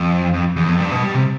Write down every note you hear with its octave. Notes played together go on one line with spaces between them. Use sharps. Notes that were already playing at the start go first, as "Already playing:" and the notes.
Already playing: F2
F2
E2
F2
G2
B2
G3
C3